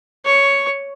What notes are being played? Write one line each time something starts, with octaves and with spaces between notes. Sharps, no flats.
C#5 C#6